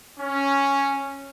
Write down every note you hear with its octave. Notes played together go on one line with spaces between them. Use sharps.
C#4